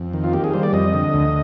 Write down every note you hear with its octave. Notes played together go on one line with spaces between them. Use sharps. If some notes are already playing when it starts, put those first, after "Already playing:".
Already playing: F2
D#3
F4
A#3 G4
G#4
G3 C5
D5
F2 D#5
D3
D2